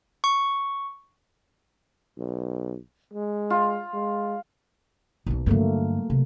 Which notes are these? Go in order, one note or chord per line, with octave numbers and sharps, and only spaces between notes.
C#6
B1
G#3
F4
G#3
B1 A#3
G2 D3 F#3 A3 A#3
C3